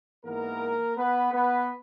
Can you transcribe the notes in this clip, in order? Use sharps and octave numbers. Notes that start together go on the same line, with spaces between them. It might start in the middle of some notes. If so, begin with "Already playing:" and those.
G#2 E3 A#3 B3 A#4
B3 B4
B3 B4